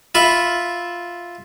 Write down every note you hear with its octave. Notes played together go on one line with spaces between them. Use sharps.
F4 E5 B5 C#6